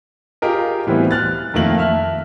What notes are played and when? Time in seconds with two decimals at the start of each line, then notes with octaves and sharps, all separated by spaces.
0.42 F4 G4 G#4 A#4 D#5
0.87 A2 E3 G3 B3 C4 F#4
1.11 F6 F#6 A6
1.54 F2 D#3 A3 A#3 F#7
1.78 E5 A5 F6